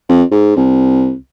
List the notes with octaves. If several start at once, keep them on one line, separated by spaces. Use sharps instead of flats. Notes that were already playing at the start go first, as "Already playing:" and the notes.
F2
G#2
C2